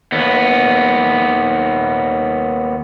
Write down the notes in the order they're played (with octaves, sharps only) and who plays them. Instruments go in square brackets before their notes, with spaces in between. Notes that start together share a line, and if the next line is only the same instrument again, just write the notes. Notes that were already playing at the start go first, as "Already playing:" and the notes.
[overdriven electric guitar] D#2 B3